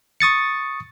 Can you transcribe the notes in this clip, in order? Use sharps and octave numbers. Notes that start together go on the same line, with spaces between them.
C#6 D#6 A6 C#7